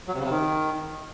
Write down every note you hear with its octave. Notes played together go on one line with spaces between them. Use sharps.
F#3
C3
C#3
C3
D#3